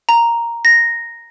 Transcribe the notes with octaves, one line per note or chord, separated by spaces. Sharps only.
A#5
A#6